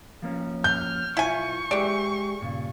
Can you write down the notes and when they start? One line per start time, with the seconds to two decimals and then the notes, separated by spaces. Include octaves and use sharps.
0.22 F3 A#3 C#4
0.64 F6 G6
1.17 B1 E4 F4 G#5 C#6
1.71 E3 G#3 G4 G#4 D5
2.41 G2 A#2 C#3